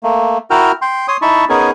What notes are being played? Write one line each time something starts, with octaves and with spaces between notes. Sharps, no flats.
A3 A#3
E4 F#4 A#4 G5 F6
G5 C6
C#5 C6 D#6
D#4 E4 A5 B5 C#6
B3 C#4 D#4 G#4 A#4 G#5